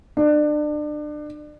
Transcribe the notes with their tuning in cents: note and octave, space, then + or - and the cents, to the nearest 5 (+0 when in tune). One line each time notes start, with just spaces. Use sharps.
D4 +30